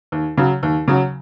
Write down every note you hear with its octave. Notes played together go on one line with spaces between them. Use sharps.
D#2
C#3 F#3
D#2
C#3 F#3